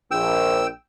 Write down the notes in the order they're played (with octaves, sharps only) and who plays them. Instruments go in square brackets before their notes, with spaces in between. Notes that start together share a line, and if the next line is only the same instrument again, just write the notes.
[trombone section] A#1 [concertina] G5 E6